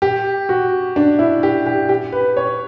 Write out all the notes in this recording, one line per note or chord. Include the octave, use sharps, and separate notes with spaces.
G4
F#4
D4
E4
G4
G4
G4
B4
C#5